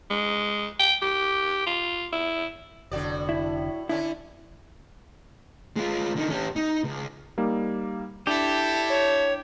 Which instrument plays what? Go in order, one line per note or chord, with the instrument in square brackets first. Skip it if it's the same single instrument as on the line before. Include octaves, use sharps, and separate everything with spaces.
[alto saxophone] G#3
G5
G4
F4
E4
[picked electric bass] F1 D3 [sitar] A2 F#4 D5
[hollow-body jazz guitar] E4
[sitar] D3 C#4 D4 [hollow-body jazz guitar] E4
[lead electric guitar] G#3 F4
D3 D#4
C#4 G4
D#4
C#2
[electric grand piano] G3 A#3 D#4
[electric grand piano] D4 [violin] E4 A4 [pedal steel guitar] G4
[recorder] C#5